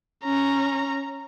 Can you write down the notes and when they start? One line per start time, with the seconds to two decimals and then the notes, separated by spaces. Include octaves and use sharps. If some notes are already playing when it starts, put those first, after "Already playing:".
0.24 C#4 A#5